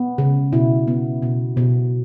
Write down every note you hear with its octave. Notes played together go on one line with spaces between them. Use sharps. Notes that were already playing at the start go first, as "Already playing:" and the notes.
Already playing: B3
C#3
B2 E4
B3
B2
B2